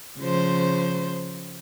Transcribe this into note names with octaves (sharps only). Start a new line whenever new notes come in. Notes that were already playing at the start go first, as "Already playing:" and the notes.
C#3 F3 C5